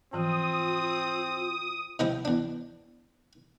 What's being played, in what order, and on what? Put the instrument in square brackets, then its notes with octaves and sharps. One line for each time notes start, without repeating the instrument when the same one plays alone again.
[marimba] G#2 E3 F3 [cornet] C4 [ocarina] F4 [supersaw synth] D#6
[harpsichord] C3 D#3 F3 G#3 E4 C5
E2 D4